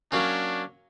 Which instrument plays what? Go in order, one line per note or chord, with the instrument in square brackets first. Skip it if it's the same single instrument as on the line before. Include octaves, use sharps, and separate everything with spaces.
[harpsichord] F#3 A#3 C#4 [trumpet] D4